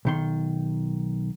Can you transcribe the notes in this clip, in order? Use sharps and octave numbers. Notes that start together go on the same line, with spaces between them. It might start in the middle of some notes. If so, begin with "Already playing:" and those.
B1 D#3 C6